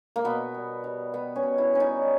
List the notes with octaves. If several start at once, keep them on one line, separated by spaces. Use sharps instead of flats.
A#3
B2 B3
G3
G3
B2 B3
C#4
B2
E4
G3 C#4
D#4
G3